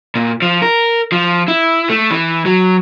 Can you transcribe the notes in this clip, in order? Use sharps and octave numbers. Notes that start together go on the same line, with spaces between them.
A#2
F3
A#4
F3
E4
A3
E3
F#3